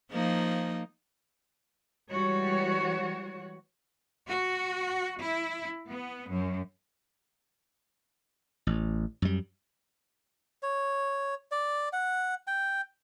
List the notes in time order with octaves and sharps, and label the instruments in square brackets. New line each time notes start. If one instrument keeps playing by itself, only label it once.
[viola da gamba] F3 A#3 D#4
[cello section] E3 G3 G#3 F#4 C#5
F#4
E4
B3
F#2
[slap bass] A1
F#2 G3
[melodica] C#5
D5
F#5
G5